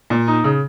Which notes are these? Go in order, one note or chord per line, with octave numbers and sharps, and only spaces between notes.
A#2
D#4
C#3